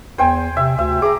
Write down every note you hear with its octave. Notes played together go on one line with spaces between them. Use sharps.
E2 C5 G5 G#5
C3 E5
D2 E5
G#4 A#5 D6